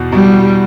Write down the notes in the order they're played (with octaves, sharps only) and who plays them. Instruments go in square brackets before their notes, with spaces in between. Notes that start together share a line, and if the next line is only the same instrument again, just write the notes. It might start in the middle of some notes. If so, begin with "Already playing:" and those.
Already playing: [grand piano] E2 B2
[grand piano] B2 [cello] G3